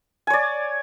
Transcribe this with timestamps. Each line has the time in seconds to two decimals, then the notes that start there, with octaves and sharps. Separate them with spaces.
0.27 G#5
0.30 C#5
0.33 D5